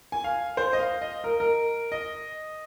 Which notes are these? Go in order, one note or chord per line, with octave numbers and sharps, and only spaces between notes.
G#5
F5
C5
D#5
F5
D#5
A#4
A#4
D#5